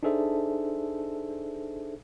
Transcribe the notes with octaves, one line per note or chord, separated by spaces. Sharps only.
D4 D#4 G#4 A4 C5 E5